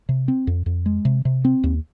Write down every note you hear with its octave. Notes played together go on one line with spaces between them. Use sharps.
C3
C4
F2
F2
G#3
C3
C3
C4
D#2